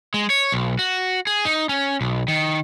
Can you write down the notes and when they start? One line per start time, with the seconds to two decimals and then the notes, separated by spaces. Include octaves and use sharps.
0.14 G#3
0.30 C#5
0.52 B1
0.79 F#4
1.27 G#4
1.45 D#4
1.69 C#4
2.01 B1
2.28 D#3